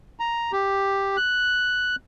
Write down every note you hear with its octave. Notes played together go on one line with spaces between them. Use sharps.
A#5
G4
F#6